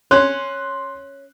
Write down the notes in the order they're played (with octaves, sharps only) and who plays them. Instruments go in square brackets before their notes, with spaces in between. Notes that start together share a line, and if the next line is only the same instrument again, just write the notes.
[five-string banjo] C#4 [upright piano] C6 F#6